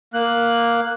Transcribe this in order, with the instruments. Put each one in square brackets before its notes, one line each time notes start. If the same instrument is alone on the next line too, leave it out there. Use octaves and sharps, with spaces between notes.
[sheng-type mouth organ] A#3 F#6